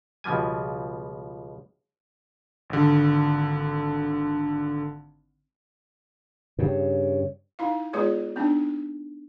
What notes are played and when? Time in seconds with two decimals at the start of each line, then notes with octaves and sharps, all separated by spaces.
0.24 C#2 B2 F3 G3 G#5
2.70 G#1 D3
6.59 G2 C#3
7.59 D#4 E4 F5
7.93 G#3 B3 F4 G#4 B4 C#5
8.36 B3 C4 D4 D#4